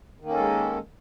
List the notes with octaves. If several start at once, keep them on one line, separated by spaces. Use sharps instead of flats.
D#3 G#3 A#3 C#4 A4